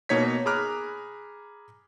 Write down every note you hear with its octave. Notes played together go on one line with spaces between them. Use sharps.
B2 A#3 D#4 C#5 G#6 B6
G#4 A#5 B5 D6 F6 F#6